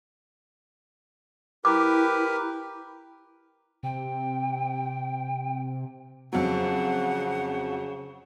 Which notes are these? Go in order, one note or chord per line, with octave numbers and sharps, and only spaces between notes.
E4 G4 A#4 B4 D6
C3 G5
F2 C#3 F#3 F#5